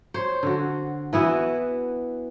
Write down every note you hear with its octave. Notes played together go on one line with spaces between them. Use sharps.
C5 C#5
D3 F#4
E3 B3 E4 F#4